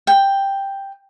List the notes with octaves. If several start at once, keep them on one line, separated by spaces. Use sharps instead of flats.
G5